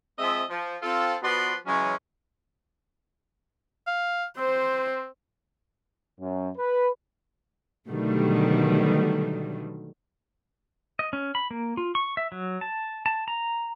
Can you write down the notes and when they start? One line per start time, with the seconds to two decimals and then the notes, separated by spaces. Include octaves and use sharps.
0.19 F3 G#3 C4 D#5 E5
0.49 F3
0.82 C4 F4 A4
1.23 F3 B3 F#4 B4 D5 C6
1.66 C#3 E3 F#3 G#3 C#4
3.87 F5
4.37 C4 C5
6.20 F#2
6.57 B4
7.88 B2 D3 D#3 F#3 G3 A3
10.99 D#5
11.13 C#4
11.35 B5
11.51 A#3
11.77 F4
11.95 C#6
12.17 E5
12.32 F#3
12.61 A5
13.06 A5
13.28 A#5